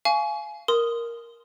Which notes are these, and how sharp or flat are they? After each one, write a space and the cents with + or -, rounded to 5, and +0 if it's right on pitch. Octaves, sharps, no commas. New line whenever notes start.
F5 -15 G#5 +25 C#6 +30
A#4 +0 C6 -10 D#6 +0